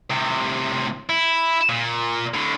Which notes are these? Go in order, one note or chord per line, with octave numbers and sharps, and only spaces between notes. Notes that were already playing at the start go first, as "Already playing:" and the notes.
A2 C3
E4
A#2
A2 D3